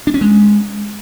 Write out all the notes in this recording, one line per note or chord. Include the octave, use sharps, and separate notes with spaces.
D4
C#4
G#3